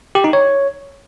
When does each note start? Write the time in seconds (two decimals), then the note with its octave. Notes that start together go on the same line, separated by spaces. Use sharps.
0.15 G4
0.24 D#4
0.33 C#5